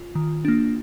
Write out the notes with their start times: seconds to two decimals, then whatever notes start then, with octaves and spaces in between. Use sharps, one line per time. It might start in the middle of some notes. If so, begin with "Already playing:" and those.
Already playing: F4
0.15 D#3
0.45 A#3 D4